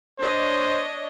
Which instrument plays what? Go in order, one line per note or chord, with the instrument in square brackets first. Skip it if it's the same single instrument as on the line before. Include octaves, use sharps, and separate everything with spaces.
[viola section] D4 C#5 D#5 [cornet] C5